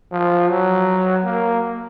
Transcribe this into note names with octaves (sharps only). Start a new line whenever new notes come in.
F3
F#3
A#3